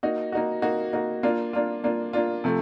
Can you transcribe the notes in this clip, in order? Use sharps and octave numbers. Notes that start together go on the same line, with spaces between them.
A#3 D#4 F#4
A#3 D#4 F#4
A#3 D#4 F#4
A#3 D#4 F#4
A#3 D4 F4
A#3 D4 F4
A#3 D4 F4
A#3 D4 F4
C3 F3 A3